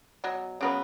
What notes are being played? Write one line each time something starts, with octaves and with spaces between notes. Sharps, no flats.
B2 F#3
C#3 F#3 B3